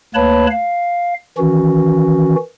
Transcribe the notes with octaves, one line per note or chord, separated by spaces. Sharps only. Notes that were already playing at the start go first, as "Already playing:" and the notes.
D2 A#3 B4 C#5 A5 B5
F5
D#3 E3 C#4 F#4